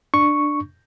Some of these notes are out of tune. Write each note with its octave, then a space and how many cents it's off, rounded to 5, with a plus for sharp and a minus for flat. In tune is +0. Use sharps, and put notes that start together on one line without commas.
D4 +10 C#6 +0